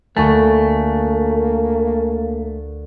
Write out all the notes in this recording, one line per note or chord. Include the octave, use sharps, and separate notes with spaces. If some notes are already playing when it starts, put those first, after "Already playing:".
D2 A3 A#3 A4 G#5 A5 C#6